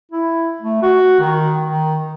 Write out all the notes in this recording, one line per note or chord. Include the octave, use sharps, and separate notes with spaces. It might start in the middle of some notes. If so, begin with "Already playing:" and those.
E4
A3
F#4
D#3
D#3